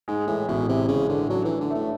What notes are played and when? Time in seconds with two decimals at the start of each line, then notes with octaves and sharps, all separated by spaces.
0.08 G#2 G#3
0.27 A2 E3
0.48 A1 B2
0.69 C3 E3
0.88 A1 C#3
1.09 A1 D3
1.30 F#3 D4
1.45 E3 A3
1.60 D3
1.70 A2 A3